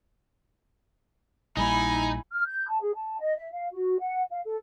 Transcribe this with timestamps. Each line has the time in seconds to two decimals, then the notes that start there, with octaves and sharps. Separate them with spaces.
1.57 A#1 G3 A#3 D#4 E4 G#5 B5
2.32 F6
2.46 G6
2.68 A5
2.81 G#4
2.94 A5
3.19 D#5
3.37 E5
3.51 F5
3.72 F#4
3.99 F#5
4.31 F5
4.45 A4